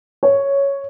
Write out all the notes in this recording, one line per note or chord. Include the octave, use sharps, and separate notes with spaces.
C#5